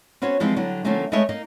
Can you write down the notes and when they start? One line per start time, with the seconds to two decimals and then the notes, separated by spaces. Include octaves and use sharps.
0.22 B3 C#4 F#4 C5 C#5
0.40 E3 F3 G3 G#3 B3 C4
0.56 D3 F#3 G3
0.84 D3 F3 G3 A3 A#3 C#4
1.12 G#3 A3 B4 C#5 D#5 E5
1.29 A#3 D#4